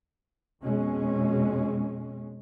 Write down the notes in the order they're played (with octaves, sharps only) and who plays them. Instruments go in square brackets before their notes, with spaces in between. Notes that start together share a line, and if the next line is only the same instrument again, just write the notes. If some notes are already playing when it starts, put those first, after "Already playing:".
[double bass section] F2 B2 G#3 C#4